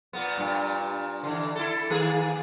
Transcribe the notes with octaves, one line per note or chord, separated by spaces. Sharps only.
A#2 A#3 B3
G2 A#2
D3 E3
E4 A4
D#3 A#3 G#4